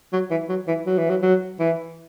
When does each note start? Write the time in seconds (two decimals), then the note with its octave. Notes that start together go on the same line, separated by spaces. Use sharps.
0.13 F#3
0.30 E3
0.49 F#3
0.68 E3
0.86 F#3
0.98 E3
1.10 F#3
1.22 F#3
1.59 E3